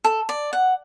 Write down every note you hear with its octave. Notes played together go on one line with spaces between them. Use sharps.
A4
D5
F#5